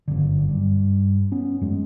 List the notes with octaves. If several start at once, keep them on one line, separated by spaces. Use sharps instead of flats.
G1 F#2 D3
G2
B3 C#4
F#2 G#3